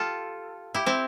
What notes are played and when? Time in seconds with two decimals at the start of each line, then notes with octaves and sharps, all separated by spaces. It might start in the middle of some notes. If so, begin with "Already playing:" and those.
Already playing: F4 G4 A4
0.74 E4 G4
0.86 C4 E4